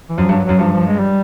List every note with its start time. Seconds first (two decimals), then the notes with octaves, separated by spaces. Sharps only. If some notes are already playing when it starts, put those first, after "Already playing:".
0.09 E3
0.18 F#2 F3
0.29 G2
0.32 F#3
0.45 F#2 F#3
0.59 G2 F3
0.72 F3
0.87 G#3
1.00 G3